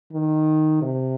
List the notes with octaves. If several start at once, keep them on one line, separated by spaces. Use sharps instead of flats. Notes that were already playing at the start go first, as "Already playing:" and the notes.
D#3
C3